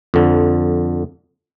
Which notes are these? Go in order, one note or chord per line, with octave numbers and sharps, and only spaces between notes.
F2 D3